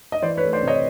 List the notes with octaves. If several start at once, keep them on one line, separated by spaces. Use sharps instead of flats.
D#5
E3 C5 D5
B4 C#5
A3
C5 D5
C3 C#5 D#5